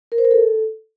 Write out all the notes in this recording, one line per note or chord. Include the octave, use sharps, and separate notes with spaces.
A#4
C5
A#4
A4